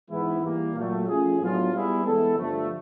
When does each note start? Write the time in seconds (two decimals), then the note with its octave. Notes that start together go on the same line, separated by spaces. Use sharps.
0.10 G#2 E3 G#3 B3 E4
0.43 E3 G3 A#3
0.75 A#2 F#3 A3
1.08 F3 A3 C#4 F4 G#4
1.40 A2 F#3 B3 D4 F4
1.73 G3 B3 E4 G#4
2.04 E3 G#3 B3 E4 A4
2.37 G2 D3 F3 A3